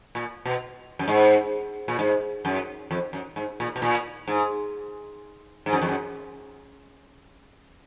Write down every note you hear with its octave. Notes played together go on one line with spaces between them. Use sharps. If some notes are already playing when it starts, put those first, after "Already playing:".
A#2
B2
F#2
G#2
A#2
G#2
F#2
F2
F#2
G#2
A#2
B2
A#2
G#2
G#2
F#2
F2
F#2